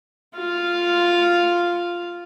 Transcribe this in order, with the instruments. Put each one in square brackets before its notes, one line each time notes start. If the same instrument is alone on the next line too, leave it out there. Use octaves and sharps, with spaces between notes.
[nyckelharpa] F4 F5